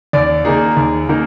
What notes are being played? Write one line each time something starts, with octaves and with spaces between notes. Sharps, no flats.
D#2 D5
D#3 A#3 D#4 G#4
D#2
D#3 A#3 D#4